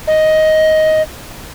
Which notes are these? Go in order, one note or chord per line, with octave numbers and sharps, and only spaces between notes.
D#5